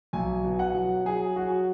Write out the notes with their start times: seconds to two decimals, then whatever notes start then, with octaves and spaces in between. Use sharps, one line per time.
0.13 B1 G#5
0.44 B2
0.59 F#5
0.75 F#3
1.05 F#3 G#4
1.36 F#3 F#4